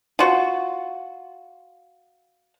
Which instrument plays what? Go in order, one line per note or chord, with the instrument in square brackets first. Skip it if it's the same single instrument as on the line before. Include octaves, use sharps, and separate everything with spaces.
[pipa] F4 F#4